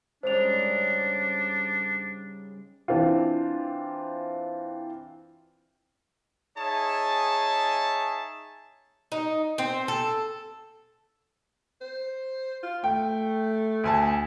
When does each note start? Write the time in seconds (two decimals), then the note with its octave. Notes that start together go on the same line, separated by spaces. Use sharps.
0.23 G#2 C#3 G3 D4 C5 F7
2.88 E3 C4 D4 F4
6.57 D#4 G#4 C#5 E5 G#5 A5
9.12 D#4
9.58 C4
9.88 A4
11.81 C5
12.63 F4
12.84 A3 G5
13.84 D2 G#5 A5